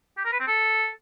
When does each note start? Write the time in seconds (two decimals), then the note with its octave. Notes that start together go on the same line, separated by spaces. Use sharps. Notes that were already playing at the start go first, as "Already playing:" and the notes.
0.17 G4
0.25 A#4
0.32 B4
0.40 C4
0.47 A4